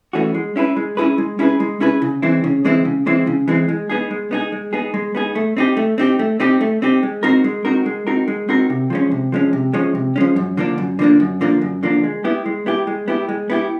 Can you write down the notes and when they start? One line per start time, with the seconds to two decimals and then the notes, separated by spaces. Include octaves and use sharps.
0.13 E3 A3 C#4 F#4
0.34 G#3
0.56 C#4 E4 G#4 B4
0.76 G#3
0.97 C#4 E4 G#4 B4
1.18 G#3
1.39 C#4 E4 G#4 B4
1.60 G#3
1.80 C#4 E4 G#4 B4
2.02 C#3
2.22 E3 G#3 C4 E4
2.44 C#3
2.65 E3 G#3 C4 E4
2.85 C#3
3.06 E3 G#3 C4 E4
3.27 C#3
3.48 E3 G#3 C4 E4
3.68 G#3
3.90 B3 D#4 G#4
4.11 G#3
4.31 B3 D#4 G#4
4.52 G#3
4.73 B3 D#4 G#4
4.94 G#3
5.15 B3 D#4 G#4
5.35 A3
5.57 C4 D#4 G4
5.77 A3
5.98 C4 D#4 G4
6.19 A3
6.40 C4 D#4 G4
6.61 A3
6.82 C4 D#4 G4
7.03 G#3
7.23 C4 D#4 F#4 A#4
7.44 G#3
7.65 C4 D#4 F#4 A#4
7.86 G#3
8.07 C4 D#4 F#4 A#4
8.28 G#3
8.49 C4 D#4 F#4 A#4
8.70 C3
8.90 F3 G#3 C#4
9.11 C3
9.32 F3 G#3 C#4
9.53 C3
9.73 F3 G#3 C#4
9.95 C3
10.16 F3 G#3 C#4
10.36 F#2
10.57 D3 F3 A#3 D4
10.78 F#2
10.99 D3 F3 A#3 D4
11.20 F#2
11.41 D3 F3 A#3 D4
11.61 F#2
11.83 D3 F3 A#3 D4
12.04 G#3
12.24 B3 E4 G4
12.46 G#3
12.66 B3 E4 G4
12.87 G#3
13.08 B3 E4 G4
13.29 G#3
13.50 B3 E4 G4